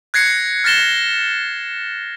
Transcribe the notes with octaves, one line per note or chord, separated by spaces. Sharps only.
F#6 G#6 A#6 C7 C#7
F6 A6 A#6 E7 G7